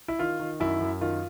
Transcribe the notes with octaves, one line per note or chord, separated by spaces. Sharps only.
E4
D#3 F4
D#3
F#2 E4
F#2
D#3 F4